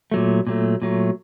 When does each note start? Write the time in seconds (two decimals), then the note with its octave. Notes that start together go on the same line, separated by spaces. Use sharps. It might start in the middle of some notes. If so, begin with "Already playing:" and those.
0.12 A#2 F#3 A3
0.47 A#2 F#3 A3
0.82 A#2 F#3 A3